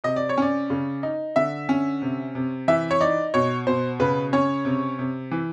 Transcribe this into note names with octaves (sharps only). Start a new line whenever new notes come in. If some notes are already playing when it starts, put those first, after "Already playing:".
C3 D#5
D5
C#5
C#4 D5
C#3
D#4
D3 E5
C#4
C3
C3
E3 E5
C#5
D#4 D5
B2 C#5
B2 C5
C#3 B4
C#4 C#5
C3
C3
E3